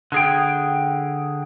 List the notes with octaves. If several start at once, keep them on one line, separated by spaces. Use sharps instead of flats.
D3 G#4 G5